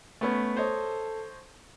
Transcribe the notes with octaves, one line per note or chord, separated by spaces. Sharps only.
A3 B3 C#4
A4 C5 C#5 D#5